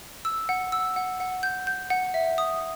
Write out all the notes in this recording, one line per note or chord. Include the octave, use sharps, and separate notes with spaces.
E6
F#5
E6
F#5
F#5
G6
G6
F#5
E5
D#6